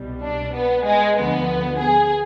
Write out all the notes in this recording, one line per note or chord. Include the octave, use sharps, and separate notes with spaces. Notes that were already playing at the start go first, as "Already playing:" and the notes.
Already playing: C2 B2 G3
D4
B3
G#3
D2 D3 F3 B3
G#4